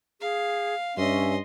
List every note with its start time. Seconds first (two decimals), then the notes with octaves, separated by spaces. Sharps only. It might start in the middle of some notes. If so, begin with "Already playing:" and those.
0.21 G#4 F5
0.97 G2 C#4 D#5 E5 C6